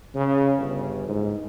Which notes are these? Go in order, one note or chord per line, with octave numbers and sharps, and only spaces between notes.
C#3
G1
G#2